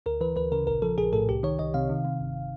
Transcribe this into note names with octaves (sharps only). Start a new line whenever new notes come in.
D2 A#4
E3 B4
D2 B4
C#3 A#4
A#1 A#4
F3 A4
A#1 G#4
A2 A4
C2 G4
D#3 C#5
C2 D#5
C3 F5
D#3
C3
G1